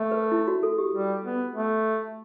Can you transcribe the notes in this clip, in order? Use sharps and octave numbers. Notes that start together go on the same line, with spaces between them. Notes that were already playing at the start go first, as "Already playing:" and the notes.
Already playing: A3
B4
E4
F#4
A4
G4
G3
B3
A3